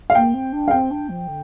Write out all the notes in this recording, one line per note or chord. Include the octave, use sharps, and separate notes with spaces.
F5
A#3 G5
C4
D4
F5
C4 G5
D4
F3
D3